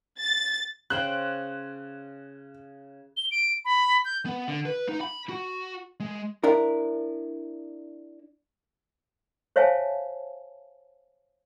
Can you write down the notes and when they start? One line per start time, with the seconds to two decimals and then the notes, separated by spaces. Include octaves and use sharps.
0.19 A6
0.90 C#3 C5 G5 F#6
3.17 G7
3.31 D7
3.65 B5
4.05 G6
4.26 B3
4.48 D3
4.66 B4
4.89 D#4
5.01 B5
5.29 F#4
6.00 G#3
6.44 D4 E4 A#4
9.56 C5 C#5 E5 F5 G#5 A5